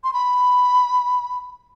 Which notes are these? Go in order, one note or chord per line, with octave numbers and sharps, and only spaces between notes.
C6
B5